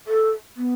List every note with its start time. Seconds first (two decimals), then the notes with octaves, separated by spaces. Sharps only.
0.07 A4
0.57 B3